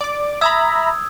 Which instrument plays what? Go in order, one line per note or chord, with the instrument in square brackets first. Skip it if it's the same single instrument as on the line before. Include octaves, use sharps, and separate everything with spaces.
[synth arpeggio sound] D5 D6
[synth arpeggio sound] E5 A#5 B5 [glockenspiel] D#6 E6 G#6